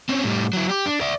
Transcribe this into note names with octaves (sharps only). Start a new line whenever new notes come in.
C4 C#4
A2 G3
F#3 E4
G4
D4
D5 E5